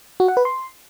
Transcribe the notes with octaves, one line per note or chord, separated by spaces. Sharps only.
F#4
F#5
B4
C6